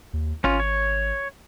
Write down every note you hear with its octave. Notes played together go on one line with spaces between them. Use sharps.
D#2
G#1 C#4 F4
C#5